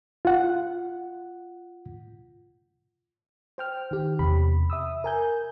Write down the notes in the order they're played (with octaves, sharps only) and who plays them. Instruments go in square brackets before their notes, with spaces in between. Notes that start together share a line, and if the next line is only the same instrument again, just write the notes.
[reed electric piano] F4 F#5
[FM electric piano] C5 G5 F6
D#3 G4
E2 C3 B5
E5 D#6 E6
A#4 G#5 G6